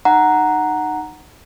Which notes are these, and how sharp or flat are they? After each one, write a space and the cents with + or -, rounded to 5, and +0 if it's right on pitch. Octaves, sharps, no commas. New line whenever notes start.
D#4 -20 F#5 +0 A#5 +0